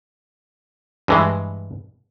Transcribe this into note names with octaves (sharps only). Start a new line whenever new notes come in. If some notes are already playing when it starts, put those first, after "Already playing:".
G2 E3 G#3